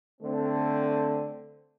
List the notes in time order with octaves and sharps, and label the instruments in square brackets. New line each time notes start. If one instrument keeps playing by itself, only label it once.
[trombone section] D3 A3 C4